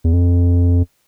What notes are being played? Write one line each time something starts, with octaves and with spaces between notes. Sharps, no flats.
E2
F2